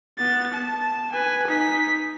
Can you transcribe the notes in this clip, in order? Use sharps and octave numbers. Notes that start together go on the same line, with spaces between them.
B3 A6
A5
B4 G#5
D#4 B6